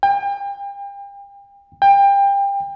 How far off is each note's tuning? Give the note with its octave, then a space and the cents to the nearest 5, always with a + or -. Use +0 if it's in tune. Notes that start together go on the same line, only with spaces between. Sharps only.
G5 +35
G5 +25